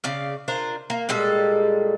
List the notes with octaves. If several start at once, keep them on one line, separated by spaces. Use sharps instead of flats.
C#3 D5 F5
D4 F4 A#4 C5
A#3
A#2 G3 G#3 A4